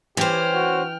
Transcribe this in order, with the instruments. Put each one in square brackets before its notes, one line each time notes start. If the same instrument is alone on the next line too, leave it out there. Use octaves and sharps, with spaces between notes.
[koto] E3 [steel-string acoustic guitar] C#4 C5 [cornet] G4 [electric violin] G5 F6
[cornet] F#4